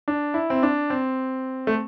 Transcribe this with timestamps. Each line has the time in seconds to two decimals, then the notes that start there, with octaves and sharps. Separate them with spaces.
0.08 D4
0.34 E4
0.50 C4
0.63 D4
0.90 C4
1.67 A3